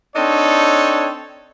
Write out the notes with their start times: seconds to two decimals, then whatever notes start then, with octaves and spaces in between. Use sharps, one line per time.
0.16 C4 D4 D#4 A4 C#5